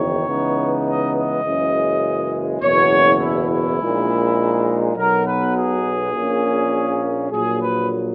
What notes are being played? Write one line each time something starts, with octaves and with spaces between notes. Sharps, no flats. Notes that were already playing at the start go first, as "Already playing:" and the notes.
Already playing: F#1 E2 D#3 C#5
C#2 C#3 E3 B3 D#4
D#5
D#5
F#1 F#2 C#3 E3 G#3
F#1 E2 B2 C#5
E4
E4
A#1 A#2 G#3 D#4
B1 B2 F#3 A#4
B4
G#4
A#1 A#2 A#3 C#4
A#1 A#2 F#3 A#3 G#4
B4